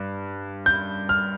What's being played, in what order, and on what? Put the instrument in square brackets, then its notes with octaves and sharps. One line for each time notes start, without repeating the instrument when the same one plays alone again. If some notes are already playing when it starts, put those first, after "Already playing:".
Already playing: [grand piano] G2
G6
F6